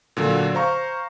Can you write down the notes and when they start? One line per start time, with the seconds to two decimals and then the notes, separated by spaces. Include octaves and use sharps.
0.17 A#2 D3 F#3
0.55 C5 F5 A#5 C#6